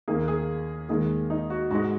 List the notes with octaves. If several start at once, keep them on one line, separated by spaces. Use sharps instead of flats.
D#2 D#3 A#3 G#4
G#4
D#2 D#3 G#3 G#4
D#4
F#4
G#2 G#3 F#4